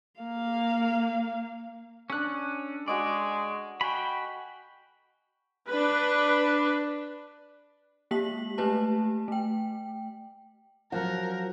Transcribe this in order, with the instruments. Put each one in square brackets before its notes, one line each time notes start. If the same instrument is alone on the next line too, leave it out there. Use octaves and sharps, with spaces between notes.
[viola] A#3 F5
[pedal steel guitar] C#4 F#6 [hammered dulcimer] D4 A4
[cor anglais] G#3 [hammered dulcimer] F#4 D#5 C#6 [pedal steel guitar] D5
[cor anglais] F#4 [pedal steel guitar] G5 B5 [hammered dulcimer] G#5
[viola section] D4 B4
[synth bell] G#3 A#3 G4 B6 F#7
A3 G4 B4 A5
A3 G5
[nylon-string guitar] F3 [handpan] F#3 F#5 [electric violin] A#4